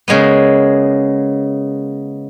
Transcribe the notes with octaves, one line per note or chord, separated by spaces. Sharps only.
C#3 G#3 A#3 B3